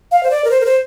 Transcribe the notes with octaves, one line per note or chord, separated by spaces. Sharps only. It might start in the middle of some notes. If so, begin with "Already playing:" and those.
F5
C5
D5
A#4
C5
A#4
C5